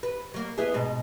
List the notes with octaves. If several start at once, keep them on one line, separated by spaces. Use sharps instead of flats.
B4
F#3 A#3
B3 E4 G#4
G#2 B2